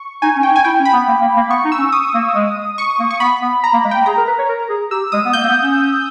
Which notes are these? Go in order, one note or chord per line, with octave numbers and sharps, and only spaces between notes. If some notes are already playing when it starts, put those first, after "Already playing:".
Already playing: C#6
D#4 G#5
C#4
G5
D#4
G#5
E4 G5
C#4
B5
B3
A#3
A#3
A#3
B3 C#6
D#4
E6
C#4
D#6
A#3
G#3
C#6
A#3
C#6
B3 B5
B3
A#5
A#3
G#3
A#3 G5
G#4 A#5
A#4
B4
C#5
A#4
G#4
G4 E6
G#3 D#6
B3
A#3 G6
A#3
B3
C#4